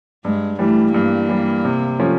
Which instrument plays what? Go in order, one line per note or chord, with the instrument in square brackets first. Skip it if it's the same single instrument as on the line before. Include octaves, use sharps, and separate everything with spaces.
[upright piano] G2 [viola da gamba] G#3
[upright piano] E3 G3 [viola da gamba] A3
[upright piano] G2 [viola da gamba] A#3
[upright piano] E3 G3
C3
F3 A3 C#4